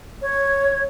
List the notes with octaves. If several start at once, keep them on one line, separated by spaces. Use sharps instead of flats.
C#5